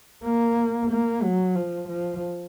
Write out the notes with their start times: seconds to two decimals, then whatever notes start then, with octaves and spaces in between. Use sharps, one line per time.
0.24 A#3
0.91 A#3
1.23 F#3
1.56 F3
1.89 F3